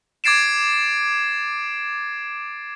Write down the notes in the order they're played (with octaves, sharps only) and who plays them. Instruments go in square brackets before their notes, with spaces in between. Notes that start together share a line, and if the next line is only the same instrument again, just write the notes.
[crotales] D6 G#6 A6 C7 D7 E7